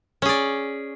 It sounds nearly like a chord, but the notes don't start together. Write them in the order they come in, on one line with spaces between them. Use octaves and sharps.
C#4 G#4 D5